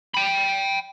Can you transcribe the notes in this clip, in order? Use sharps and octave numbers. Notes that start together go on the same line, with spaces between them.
G5 B5